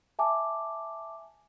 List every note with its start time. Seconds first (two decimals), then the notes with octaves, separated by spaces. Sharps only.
0.19 E5 G#5 A5 D6